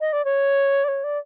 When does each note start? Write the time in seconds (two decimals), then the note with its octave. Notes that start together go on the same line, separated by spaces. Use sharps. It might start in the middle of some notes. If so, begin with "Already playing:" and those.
0.01 D#5
0.13 D5
0.25 C#5
0.84 D5
0.88 C#5
1.04 D5